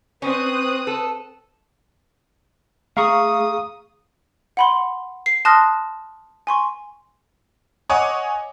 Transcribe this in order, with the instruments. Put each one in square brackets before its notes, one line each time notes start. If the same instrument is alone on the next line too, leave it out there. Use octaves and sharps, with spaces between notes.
[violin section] C4 D#6 F#6 [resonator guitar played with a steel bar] C#4 [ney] B4
[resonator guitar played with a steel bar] A4
[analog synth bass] A3 [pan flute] G#4 [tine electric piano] F5 A#5 C#6 [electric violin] D#6
[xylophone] F#5 B5 C6
C7
A5 C6 D#6 F6 F#6 A#6
G#5 C6 C#6
[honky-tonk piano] C#5 D#5 F#5 G#5 D6